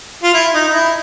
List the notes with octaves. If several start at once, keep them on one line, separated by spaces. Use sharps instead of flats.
F4
E4
D#4
D#4
E4